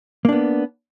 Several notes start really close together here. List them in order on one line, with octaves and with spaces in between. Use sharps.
A#3 D4 B3